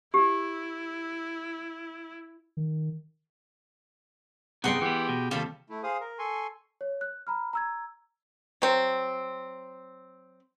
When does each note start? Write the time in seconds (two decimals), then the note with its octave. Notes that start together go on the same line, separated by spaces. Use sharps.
0.14 E4 G4
2.57 D#3
4.64 C3 B3 D#4 G#4 F#5 G5 C6
4.81 E3 B3 G4
5.09 B2
5.31 D#2 C3 G3 F4 A4 B5
5.70 A3 E4
5.83 G#4 C5 F5 D#6
6.01 A#4
6.19 A4 G#5 C6 C#6
6.81 C#5
7.01 F#6
7.27 A#5 B5 F6
7.53 A#5 E6 G#6
8.62 F#3 C4